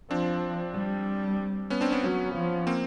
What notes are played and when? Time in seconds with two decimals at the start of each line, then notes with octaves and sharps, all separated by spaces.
0.10 F3 C4 D4
0.75 G3
1.70 B3 C#4
1.81 C4 D4
1.92 B3 C#4
2.03 F#3
2.34 F3
2.67 A#3 C4